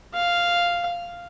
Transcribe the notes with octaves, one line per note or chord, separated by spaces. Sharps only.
F5